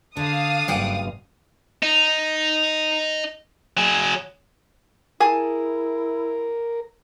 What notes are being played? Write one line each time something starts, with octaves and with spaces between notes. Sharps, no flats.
D3 D4 F5 D#6
F#1 G2 D5 F#5 G5
D#4
F#3 G#4
E4 G#4 A#4 G#5 A5